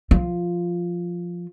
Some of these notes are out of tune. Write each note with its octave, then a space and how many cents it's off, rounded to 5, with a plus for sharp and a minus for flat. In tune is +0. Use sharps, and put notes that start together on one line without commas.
F3 +0 F4 +0